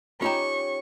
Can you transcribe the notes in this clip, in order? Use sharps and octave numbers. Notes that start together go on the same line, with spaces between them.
C#4 D#4 F4 G4 C#5 A#5 C#6